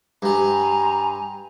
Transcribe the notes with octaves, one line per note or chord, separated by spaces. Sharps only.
G2 G3 G#5 A#5 C6